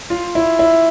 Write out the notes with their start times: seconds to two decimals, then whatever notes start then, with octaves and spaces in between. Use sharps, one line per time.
0.10 F4
0.35 E4
0.59 E4